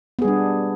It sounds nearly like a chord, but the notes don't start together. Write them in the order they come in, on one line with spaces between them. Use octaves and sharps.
B3 G#4 G3 D4